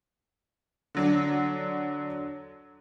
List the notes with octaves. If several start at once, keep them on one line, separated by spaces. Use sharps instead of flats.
D3 F#3 D4